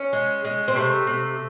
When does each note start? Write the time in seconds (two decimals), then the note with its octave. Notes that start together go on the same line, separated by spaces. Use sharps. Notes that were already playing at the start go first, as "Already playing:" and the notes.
Already playing: C#4
0.13 G#3
0.45 G#3
0.68 C4
0.75 C3 A3
1.07 C3